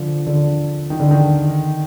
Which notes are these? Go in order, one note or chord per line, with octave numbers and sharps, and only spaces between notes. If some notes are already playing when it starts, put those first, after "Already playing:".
Already playing: D3 F3
D3
D#3
D3
D#3